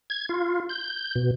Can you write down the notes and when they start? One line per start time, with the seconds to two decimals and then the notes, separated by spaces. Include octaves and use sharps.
0.10 G#6
0.29 F4
0.69 G6
1.15 B2